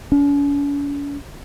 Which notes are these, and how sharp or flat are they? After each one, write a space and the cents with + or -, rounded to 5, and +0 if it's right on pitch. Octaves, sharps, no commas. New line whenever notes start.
C#4 +45